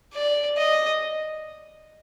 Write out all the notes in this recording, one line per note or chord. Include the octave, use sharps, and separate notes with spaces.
D5
D#5